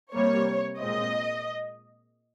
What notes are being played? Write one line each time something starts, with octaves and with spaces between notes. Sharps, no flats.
C3 G3 A#3 C#5
A#2 G#3 C4 D#5